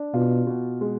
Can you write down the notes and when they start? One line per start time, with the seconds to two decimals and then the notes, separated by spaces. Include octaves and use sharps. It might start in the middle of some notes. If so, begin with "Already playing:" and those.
Already playing: D4
0.14 B2 F4
0.47 B2
0.81 G#3